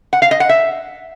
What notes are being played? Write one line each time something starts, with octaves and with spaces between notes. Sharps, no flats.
F#5
F5
D#5
F#5
E5